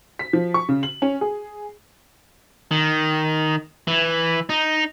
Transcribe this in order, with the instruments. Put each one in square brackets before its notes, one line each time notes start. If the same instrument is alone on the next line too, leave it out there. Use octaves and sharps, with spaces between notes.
[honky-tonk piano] B6
F3
C#6
C#3
F#7
C#4
G#4
[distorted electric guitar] D#3
E3
D#4